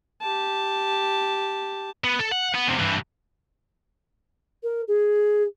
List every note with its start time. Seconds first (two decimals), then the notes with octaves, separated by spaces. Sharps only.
0.22 G4 A5
2.04 B3
2.19 A4
2.32 F#5
2.55 B3
2.68 E2 C3
2.80 G2 E3
4.63 A#4
4.88 G#4